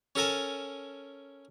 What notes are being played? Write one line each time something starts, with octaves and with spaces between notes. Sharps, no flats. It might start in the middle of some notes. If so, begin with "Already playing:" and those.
C#4 A4 A#4 G#5 A5